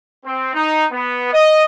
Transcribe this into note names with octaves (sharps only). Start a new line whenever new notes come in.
C4
D#4
B3
D#5